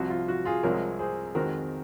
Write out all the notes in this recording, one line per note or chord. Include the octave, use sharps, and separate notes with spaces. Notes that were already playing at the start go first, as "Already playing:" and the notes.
Already playing: C2 C3 F3 F#4
F4
F#4
F4 G#4
C2 C3 F3 G#3 C4 A#4 C#5
G#4 C5
F2 D#3 G#3 C4 F#4 A#4